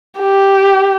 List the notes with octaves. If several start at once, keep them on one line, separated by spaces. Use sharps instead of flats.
G4